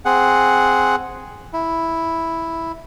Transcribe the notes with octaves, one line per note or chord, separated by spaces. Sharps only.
C4 G#4 F#5
E4